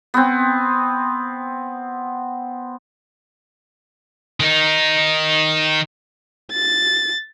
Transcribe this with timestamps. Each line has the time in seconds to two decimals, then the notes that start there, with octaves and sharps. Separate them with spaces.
0.14 B3 C4
4.40 D#3 D#4
6.52 A6